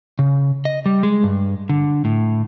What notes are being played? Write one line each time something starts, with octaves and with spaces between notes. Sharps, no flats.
C#3
D#5
G3
G#3
G2
D3
A2